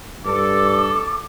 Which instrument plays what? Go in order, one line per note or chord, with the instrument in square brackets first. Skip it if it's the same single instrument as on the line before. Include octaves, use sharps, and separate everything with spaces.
[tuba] G2 [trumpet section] A4 [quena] D6